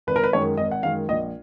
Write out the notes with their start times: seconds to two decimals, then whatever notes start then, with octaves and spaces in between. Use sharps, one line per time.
0.07 G#1 B4
0.16 A#4
0.24 B4
0.33 F#2 D#3 G#3 C#5
0.57 G#1 D#5
0.71 F#5
0.83 F#2 D#3 G#3 F5
1.09 A#1 D#5